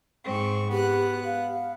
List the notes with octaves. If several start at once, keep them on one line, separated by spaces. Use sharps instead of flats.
G#2 C4 C#6
B3 G4 F#6
F5